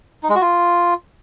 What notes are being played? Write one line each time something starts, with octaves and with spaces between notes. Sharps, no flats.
D#4
G#3
F#4
F4